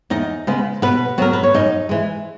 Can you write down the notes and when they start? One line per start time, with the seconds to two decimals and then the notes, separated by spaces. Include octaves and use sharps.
0.10 E2 D#4 D#5
0.47 C#3 G#3 B3
0.82 B2 B3 B4
1.18 F#3 B3 A#4
1.33 B4
1.43 C#5
1.54 F#2 D#4 D#5
1.89 E3 G#3